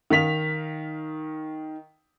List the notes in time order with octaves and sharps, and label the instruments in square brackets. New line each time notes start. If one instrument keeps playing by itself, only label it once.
[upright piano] D#3 F5 B6 F7